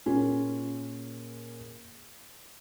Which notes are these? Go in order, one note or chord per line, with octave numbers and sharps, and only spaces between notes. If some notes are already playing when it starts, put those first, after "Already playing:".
A#2 A#3 C#4 F4 G#4